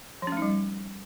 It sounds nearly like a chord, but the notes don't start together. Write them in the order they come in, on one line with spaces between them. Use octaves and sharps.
F3 C#4 A3 D#4 G3